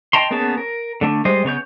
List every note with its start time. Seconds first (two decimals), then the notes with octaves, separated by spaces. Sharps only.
0.13 D#5 G5 A5 A#5 C6
0.31 A#3 B3 C#4 G#4 A5
0.58 A#4
1.01 D3 A3 D4
1.25 G3 G#3 C5 D#5
1.45 C#3 B3 C#5 G6